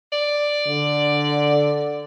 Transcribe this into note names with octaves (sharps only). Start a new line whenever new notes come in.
D5
D3